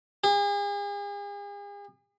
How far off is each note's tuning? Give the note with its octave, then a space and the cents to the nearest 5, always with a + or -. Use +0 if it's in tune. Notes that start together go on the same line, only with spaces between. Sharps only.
G#4 -40